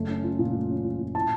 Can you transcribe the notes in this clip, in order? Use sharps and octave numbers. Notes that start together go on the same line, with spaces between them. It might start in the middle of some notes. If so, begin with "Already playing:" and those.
Already playing: F#1 A3
C#4
F4
A#2
A3
C#4
F4
A#2
A2 A5